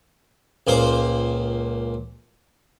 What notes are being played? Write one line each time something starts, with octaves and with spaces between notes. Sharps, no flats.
C#2 A#2 C5